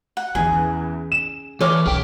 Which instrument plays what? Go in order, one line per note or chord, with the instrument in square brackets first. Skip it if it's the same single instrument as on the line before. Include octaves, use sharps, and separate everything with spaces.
[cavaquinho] F#5
[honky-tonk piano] E2 E3 [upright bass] C#4 [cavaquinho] G#4
[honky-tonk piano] E7
[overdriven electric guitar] E3 [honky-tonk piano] A4 C#5 F6 [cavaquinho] C6 D6
[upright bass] B1 C#4 [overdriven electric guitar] G#4 G5